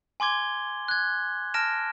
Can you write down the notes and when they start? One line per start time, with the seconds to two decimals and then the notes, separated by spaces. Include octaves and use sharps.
0.20 G#5 C6 D6 G#6 G7
0.88 F#6 G#6
1.54 A5 F6 A#6 D7 E7